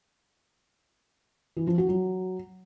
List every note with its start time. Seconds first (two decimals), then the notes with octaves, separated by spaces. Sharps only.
1.57 E3
1.67 F3
1.78 F#4
1.89 F#3